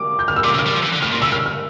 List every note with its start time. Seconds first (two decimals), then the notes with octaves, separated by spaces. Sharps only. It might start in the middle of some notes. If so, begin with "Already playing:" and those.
Already playing: D6
0.19 G6
0.28 F6
0.36 E6
0.44 A#2 D6
0.54 C#3
0.59 F6
0.66 G3
0.73 F3
0.83 E3
0.93 D3
1.02 A2 F6
1.12 A#2
1.22 C#3 E6
1.32 F6
1.46 F6